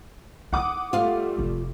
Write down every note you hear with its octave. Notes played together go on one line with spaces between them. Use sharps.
D#4 E4 F#5 D6 D#6
G3 A3 F4 F5
F1 F3